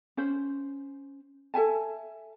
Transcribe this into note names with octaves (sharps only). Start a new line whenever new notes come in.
C#4 C5
A4 E5 G#5 A5